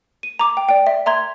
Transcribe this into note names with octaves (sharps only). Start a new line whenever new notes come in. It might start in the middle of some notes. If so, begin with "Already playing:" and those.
D#7
A#5 D6
G5
D5 G5
E5
E5 A#5 C6 G#6